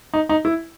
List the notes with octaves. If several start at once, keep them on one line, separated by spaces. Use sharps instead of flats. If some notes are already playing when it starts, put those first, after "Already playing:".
D#4
D#4
E4